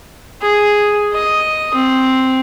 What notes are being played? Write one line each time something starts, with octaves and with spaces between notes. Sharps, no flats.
G#4
D#5
C4